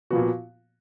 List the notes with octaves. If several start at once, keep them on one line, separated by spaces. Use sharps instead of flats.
A#2 F3 B3 F#4